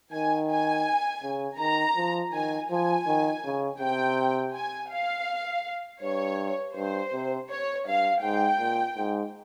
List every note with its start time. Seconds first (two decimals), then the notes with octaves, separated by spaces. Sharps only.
0.12 D#3 G#5
0.49 G#5
1.23 C#3
1.59 D#3 A#5
1.96 F3
2.32 D#3 G#5
2.70 F3 G#5
3.06 D#3
3.44 C#3
3.80 C3 G5
4.55 G#5
4.90 F5
6.01 G2 C#5
6.75 G2 C5
7.13 C3
7.49 C#5
7.86 G2 F5
8.22 G#2 G5
8.59 A#2
8.96 G#2